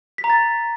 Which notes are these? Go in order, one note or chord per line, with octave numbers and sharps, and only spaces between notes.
B6
A#5
A6